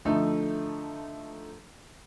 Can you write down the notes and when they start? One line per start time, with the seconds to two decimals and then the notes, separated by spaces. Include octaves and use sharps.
0.05 D3 F3 A3 D#4 A4